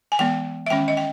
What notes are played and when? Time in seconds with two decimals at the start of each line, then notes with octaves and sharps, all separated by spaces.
0.12 G#5
0.19 E3 G#3 B3 G5
0.66 E5
0.70 D#3 G#3 C#4 G5
0.88 D#5
0.97 G5